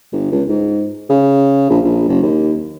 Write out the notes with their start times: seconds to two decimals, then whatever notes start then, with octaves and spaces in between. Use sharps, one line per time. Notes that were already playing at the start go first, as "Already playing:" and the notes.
0.13 G1
0.31 C#2
0.48 G#2
1.10 C#3
1.70 A#1
1.84 A#1
2.08 F#1
2.22 D#2